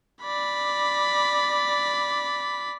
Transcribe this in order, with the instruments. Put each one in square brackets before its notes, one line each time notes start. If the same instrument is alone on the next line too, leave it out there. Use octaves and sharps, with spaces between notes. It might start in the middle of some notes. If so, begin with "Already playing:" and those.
[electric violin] D5 B5